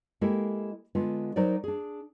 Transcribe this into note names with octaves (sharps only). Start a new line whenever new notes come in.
G#3 A#3 E4 G4 A4 A#4
D3 G#3 B3 F4
F#3 D#4 A#4 C5 D5
D4 G#4